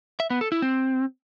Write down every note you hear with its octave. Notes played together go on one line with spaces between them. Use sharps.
E5
B3
A4
E4
C4